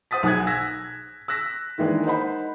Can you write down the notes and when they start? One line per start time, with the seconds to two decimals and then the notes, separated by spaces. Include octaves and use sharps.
0.11 C5 F#5 D#6 A6 B6
0.23 B1 G#4 F#5 D#6 F#6 G#6
0.47 E6 G#6 A#6 B6
1.28 E6 F#6 A#6 B6
1.78 D#3 E3 G#3 A#3 D4
2.05 D#4 C5 F#5 B5